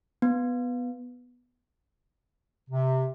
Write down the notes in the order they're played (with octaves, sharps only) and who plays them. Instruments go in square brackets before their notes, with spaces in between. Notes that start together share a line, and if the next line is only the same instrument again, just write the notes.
[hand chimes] B3
[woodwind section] C3